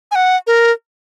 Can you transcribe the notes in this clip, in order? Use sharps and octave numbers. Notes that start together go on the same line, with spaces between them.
G#5
F#5
A#4